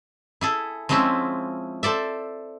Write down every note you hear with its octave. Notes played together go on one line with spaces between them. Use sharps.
E4 G#4 A4
F3 G#3 C4 C#4 E4
A4 C5 D5 E5